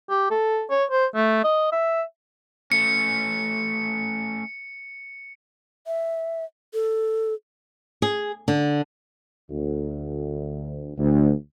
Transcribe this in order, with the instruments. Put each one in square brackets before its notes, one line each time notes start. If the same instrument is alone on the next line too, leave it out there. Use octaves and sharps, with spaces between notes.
[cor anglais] G4
A4
C#5
C5
A3
D#5
E5
[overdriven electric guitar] A3 C#4 [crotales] C#7
[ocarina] E5
A4
[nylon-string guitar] G#4
D3
[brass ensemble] D2
D2